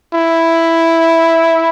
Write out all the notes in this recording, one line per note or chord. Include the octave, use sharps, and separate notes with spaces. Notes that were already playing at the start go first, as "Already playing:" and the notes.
E4